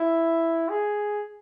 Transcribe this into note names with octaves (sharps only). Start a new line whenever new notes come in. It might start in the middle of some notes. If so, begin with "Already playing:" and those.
Already playing: E4
G#4